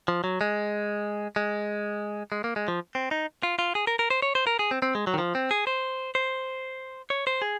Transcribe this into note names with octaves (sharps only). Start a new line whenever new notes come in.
F3
F#3
G#3
G#3
G#3
A#3
G#3
F3
C4
D#4
F4
F4
G#4
A#4
A#4
C5
C#5
C5
A#4
G#4
C4
C4
G#3
F#3
D#3
F3
C4
G#4
C5
C5
C#5
C5
G#4